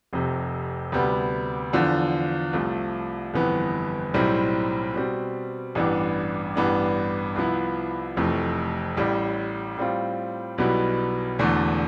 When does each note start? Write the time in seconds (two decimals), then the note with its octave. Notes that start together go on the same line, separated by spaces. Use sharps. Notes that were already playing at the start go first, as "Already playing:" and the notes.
0.13 F1 F2 C3
0.92 D2 C3 G3 B3
1.73 E2 D3 F3
2.53 C2 C3 F3 A3
3.34 G1 F2 E3 B3
4.14 B1 A2 G3 C4 E4
4.94 B2 G3 C4
5.75 A1 G2 E3 B3 D4
6.56 A1 G2 E3 B3 D4
7.36 C2 C3 F3 B3 E4
8.17 F1 F2 E3 A3
8.97 A1 A2 G3
9.77 A2 G3 C4 F4
10.58 B1 B2 G3 B3 E4
11.38 E1 E2 D3 A3